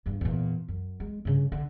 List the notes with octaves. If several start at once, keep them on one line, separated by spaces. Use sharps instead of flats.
E2 G2
E2 A#2
F#2
G#3
G2 C#3
D3